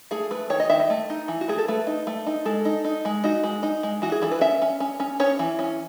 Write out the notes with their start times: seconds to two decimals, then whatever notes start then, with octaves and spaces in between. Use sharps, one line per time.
0.11 A3 G#4
0.31 A3 B4
0.50 D#3 C#5
0.60 D#5
0.70 D#3 E5
0.80 D#5
0.90 A3
1.10 D#4
1.28 E3
1.41 F#4
1.48 A3 G#4
1.58 A4
1.68 A3 B4
1.87 D#4
2.07 A3
2.26 D#4
2.45 G#3 A4
2.65 D#4
2.85 D#4
3.05 G#3
3.24 D#4 F#4
3.44 G#3
3.63 D#4
3.83 G#3
4.02 E3 F#4
4.12 G#4
4.22 E3 A4
4.32 B4
4.41 C#4 E5
4.62 C#4
4.80 C#4
5.00 C#4
5.20 C#4 C#5
5.39 E3
5.59 C#4